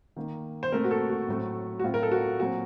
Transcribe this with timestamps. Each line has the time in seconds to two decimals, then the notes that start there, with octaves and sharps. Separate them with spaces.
0.17 D#3 A#3
0.63 C5
0.72 A#2 A3 C4 A#4
0.84 F#4
0.91 A4
1.09 F#4
1.28 A2 F#3 A3 C4
1.80 F#4
1.84 A2 F#3 C4 F4
1.94 A#4
2.03 A4
2.11 F#4
2.40 A#2 F#3 C4 F#4